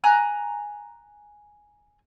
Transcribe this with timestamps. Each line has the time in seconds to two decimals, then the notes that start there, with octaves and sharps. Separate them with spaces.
0.04 G#5 A#5 F#6